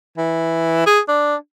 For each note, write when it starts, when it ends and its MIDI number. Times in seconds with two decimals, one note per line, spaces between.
0.17 0.85 52
0.86 1.00 68
1.08 1.36 62